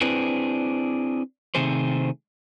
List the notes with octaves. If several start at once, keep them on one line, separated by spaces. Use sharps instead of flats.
C4 D4 E4 G#4 B4 C5
C3 D#3 A3 C4 G#4 C5